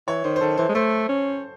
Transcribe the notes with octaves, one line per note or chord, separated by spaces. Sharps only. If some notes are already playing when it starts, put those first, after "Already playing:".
E3 C#5
D#3 C5
C5
D#3 A4
E3 C5
G#3
A3 C5
C#4